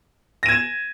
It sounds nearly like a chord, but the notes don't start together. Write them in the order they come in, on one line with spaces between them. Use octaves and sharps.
A#6 D#7 G#6 E7